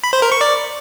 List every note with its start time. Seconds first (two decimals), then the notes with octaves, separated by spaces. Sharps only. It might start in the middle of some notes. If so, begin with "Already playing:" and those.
0.04 B5
0.13 C5
0.22 A#4
0.32 C#6
0.41 D5